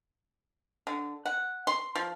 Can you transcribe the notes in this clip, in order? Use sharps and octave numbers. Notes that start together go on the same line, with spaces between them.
D3
F#5
C6
F3